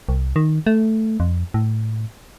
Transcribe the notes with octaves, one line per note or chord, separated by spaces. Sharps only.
C2
D#3
A3
F2
A2